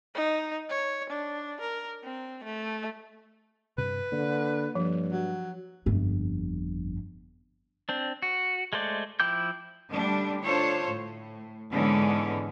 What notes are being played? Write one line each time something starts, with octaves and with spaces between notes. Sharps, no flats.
D#4
C#5
D4
A#4
C4
A3
G2 C3 B4
D3 A#3
G2 F3
F#3
G1 F2
C4 D4
F#4
G#3 A3 C5 D5
F3 E4 G5 D6 G6
D3 G3 A3 D4
D4 F4 A4 C5 C#5
A2
G#2 D3 E3 G#3 B3 C#4